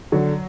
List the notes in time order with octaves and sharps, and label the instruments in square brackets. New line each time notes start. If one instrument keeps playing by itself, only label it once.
[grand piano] D3 [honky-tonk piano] F#3